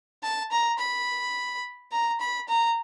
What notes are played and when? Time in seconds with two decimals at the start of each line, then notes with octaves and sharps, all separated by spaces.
0.23 A5
0.51 A#5
0.79 B5
1.92 A#5
2.20 B5
2.48 A#5